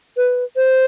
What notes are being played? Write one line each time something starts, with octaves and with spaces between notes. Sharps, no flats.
B4
C5